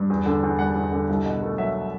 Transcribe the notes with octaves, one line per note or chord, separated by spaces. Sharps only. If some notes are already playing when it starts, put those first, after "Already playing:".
Already playing: G2
E2
D3
E2
G3 F#5
E2
D3
C2
B2
A3
F#3 E5